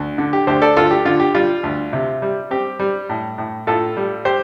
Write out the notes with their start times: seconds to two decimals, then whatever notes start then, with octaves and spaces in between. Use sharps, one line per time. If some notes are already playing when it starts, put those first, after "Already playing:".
Already playing: D2
0.18 D3
0.33 G4
0.47 D2 G4 C5
0.62 A4 D5
0.77 D2 F4 A4
0.91 G4
1.05 D3 F4
1.20 G4
1.35 G3 F4
1.63 D2
1.93 C3
2.22 G3
2.51 C4 G4
2.79 G3
3.09 A2
3.38 A2
3.67 A2 F4 A4
3.97 G3
4.25 G4 C5